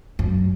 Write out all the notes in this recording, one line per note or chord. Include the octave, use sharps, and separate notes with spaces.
F#2